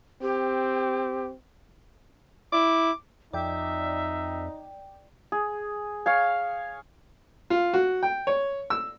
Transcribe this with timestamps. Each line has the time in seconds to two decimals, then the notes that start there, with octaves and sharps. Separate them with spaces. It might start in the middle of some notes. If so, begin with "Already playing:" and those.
0.22 C4 G4
2.52 E4 D6
3.33 F2 D#4 D5 E5 G5
5.32 G#4
6.06 C#5 F5 G#5
7.50 F4
7.74 F#4
8.03 G5
8.27 C#5
8.70 E6